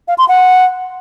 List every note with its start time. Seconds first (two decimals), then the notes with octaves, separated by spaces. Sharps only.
0.08 F5
0.18 C6
0.29 F#5